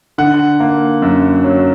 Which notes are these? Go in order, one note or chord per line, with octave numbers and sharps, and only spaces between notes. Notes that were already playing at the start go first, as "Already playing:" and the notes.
D3 F#5
A#3
F#2
F#3